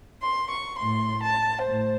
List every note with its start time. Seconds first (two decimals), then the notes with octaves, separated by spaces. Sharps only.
0.22 C6
0.51 C#6
0.80 A2 C6
1.23 A5
1.67 A2 C5